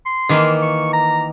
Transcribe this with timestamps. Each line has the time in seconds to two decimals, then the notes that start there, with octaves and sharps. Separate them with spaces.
0.06 C6
0.29 D#3 E3 A#3
0.62 C#6
0.93 A#5